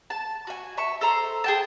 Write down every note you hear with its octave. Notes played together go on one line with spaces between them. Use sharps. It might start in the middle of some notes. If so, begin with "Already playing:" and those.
A5
F#4 G#5
E5 A5 C#6
A4 C5 A#5 C6
G#4 G5 A5